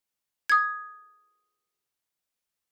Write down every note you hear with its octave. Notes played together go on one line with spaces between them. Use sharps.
D#6 G#6